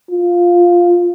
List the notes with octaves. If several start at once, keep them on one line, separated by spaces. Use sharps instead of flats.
F4